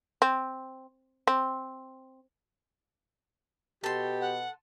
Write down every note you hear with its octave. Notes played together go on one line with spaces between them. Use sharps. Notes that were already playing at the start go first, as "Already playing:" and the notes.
C4
C4
B2 G4 A4 C6
F#5